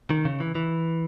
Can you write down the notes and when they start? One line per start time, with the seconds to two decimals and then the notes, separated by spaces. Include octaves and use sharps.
0.10 D#3
0.25 C#3
0.40 E3
0.55 E3